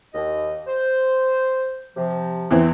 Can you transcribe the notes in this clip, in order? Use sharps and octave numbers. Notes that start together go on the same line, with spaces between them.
D#2 D#5
C5
C3 F3
E2 E3 C4